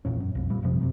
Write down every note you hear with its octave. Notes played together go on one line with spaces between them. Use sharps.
A#1 E2 A#2 C#4
F#2
B1 F2
A#2 G3
G#1 F2 C3 F3
F#2 A2 C3